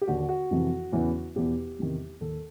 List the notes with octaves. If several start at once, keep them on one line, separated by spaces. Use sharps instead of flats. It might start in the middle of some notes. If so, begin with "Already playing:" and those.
G4
D#2 D3 F#4
F#4
F2 C3 E3
E2 C#3 E3
E2 B2 G4
E2 C3 D#3
D#2 D#3 A4